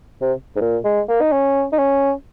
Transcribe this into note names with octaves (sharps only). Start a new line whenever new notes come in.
C3
G#2
A#2
G#3
A#3
D#4
C#4
D#4
C#4